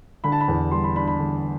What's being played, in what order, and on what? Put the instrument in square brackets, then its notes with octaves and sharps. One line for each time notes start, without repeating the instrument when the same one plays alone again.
[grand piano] D3 B5
A5
B5
E2
G3 C6
B5
D4 B5
B5
D3